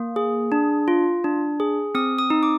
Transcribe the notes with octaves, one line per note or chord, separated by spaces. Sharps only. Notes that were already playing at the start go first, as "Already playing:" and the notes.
Already playing: A#3
G#4
D4
F4
D4
G#4
C4 D#6
D#6
D#4
D6